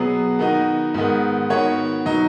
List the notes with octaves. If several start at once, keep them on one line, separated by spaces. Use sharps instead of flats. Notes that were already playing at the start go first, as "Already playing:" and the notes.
Already playing: B2 F#3 B3 G#4
D#3 B3 D#4 F#4
G#2 D#3 B3
D#3 B3 F#4 C#5
B2 F#3 D#4